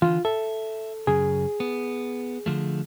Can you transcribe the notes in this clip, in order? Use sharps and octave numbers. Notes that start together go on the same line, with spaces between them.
D3 E3 F4
A4 E5
F#2 C#3 G#4
B3
D3 F3 A3